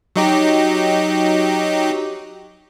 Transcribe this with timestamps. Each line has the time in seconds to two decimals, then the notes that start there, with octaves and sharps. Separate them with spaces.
0.16 F#3 D#4 G4